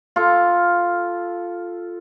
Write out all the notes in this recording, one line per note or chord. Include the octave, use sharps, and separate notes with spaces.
F4 A4